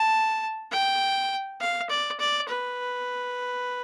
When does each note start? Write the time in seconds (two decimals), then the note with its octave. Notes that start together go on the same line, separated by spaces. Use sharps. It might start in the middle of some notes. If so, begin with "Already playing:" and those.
Already playing: A5
0.72 G5
1.60 F5
1.90 D5
2.20 D5
2.49 B4